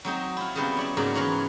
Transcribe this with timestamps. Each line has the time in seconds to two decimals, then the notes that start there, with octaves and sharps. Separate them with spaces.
0.05 F#3 C4 D#4
0.37 E4 F4
0.55 C#3 F#3 G3 B3 C4
0.76 C#5 D5 E5
0.97 G#2 C#3 F#3 A#3 D5
1.14 E3 B3 A#4 C#5 F#5 C6